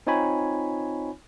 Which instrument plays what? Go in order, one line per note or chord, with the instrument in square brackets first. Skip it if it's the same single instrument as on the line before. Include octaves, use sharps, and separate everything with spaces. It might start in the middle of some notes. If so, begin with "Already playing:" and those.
[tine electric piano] C4 D#4 F4 C#5 G#5 B5